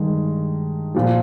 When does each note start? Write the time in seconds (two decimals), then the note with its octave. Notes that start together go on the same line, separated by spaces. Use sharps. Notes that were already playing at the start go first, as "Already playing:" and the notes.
Already playing: G2 D#3 G#3
0.94 A#2 F3